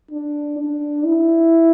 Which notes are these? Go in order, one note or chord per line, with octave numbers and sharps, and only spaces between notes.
D4
D4
E4